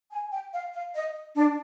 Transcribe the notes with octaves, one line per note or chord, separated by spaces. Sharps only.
G#5
G5
F5
F5
D#5
D4